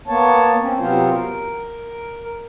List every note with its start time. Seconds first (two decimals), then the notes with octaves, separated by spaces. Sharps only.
0.08 A#3 B3 C#5 A5
0.60 C4 C#4
0.79 C3 F#3 B3 C4 F4 C5
1.11 A#4